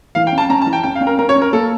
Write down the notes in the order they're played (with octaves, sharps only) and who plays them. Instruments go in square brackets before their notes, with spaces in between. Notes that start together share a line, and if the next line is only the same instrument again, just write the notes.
[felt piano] E3 [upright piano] F5
[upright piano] G5
[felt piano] C#4
[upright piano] A5
[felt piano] C#4 [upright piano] A#5
[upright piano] A5
[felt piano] E3
[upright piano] G5
[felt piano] C#4 [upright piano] G5
[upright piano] F5
[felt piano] C#4
[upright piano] A#4
[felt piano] C#4 [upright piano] A#4
[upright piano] C#5
[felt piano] C#4
[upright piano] A#4
[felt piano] A#3 [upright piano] A4